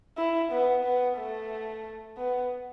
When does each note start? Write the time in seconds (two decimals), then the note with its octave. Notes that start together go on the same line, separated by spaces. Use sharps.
0.18 E4
0.52 B3
0.84 B3
1.18 A3
2.17 B3